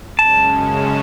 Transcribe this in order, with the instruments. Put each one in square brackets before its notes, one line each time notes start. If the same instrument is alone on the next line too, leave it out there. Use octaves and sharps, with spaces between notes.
[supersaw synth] F#2 C#3 G#3 C#4 [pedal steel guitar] A5